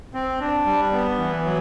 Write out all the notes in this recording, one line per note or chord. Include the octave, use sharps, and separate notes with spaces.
C4
D4
G3
B3
E3
F#3